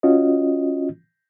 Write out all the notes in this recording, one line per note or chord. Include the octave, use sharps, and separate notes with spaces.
C#4 F4 F#4 D#5